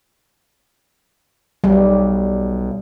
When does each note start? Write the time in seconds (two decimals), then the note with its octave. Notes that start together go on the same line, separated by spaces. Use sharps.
1.64 B1 G3